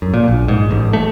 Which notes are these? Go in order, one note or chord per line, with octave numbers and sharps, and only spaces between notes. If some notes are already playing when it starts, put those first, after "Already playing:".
F#2
A#2
A#1
G#2
A1
A3